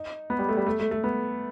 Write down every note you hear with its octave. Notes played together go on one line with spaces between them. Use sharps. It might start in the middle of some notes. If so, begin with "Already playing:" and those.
Already playing: D#4
B3
G3
A3
G3
A3
A3
A3
B3